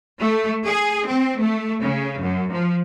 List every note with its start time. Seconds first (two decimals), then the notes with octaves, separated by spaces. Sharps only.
0.20 A3
0.65 G#4
1.06 C4
1.38 A3
1.81 C#3
2.20 F#2
2.51 F3